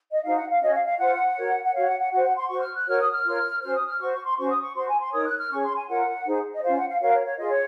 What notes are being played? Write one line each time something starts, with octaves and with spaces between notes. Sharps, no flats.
D#5
D#4 F#4 C5 F5
F#5
F5
C#4 F#4 C#5 D#5
F5
F5
F4 C5 F#5
F#4 A#4 C#5
F#5
F#4 C#5 F5
F#5
F#5
F#4 C5 F#5
F#5
C6
F#4 C5 C#6
F6
F#6
F#4 A#4 C#5 F6
D#6
F6
F4 A#4 C#5
C#4 F#4 C5 F6
D#6
F6
F#4 C5 C#6
C#6
C6
C#4 F#4 C5 C#6
D#6
C#6
F#4 C5 C6
G#5
C6
D#4 A#4 C#5 D#6
F#6
F6
C#4 G#4 C#5 C#6
C6
G#5
F4 A#4 C#5 F#5
D#4 G#4 C5
D#5
C#4 F4 C5 F5
F#5
F5
F#4 A#4 C#5 F5
C#5
C#5
F4 G#4 C#5 D#5
C#5